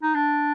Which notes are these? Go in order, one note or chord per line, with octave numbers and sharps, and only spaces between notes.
D#4
D4